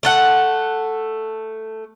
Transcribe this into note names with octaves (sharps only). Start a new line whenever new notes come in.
A3 A4 F#5